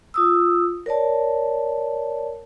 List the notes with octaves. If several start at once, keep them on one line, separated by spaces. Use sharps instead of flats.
F4 D#6 E6
A#4 C#5 D5 A5